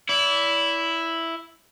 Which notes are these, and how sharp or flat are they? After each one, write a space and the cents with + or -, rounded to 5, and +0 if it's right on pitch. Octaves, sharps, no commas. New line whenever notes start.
E4 +0 D5 -40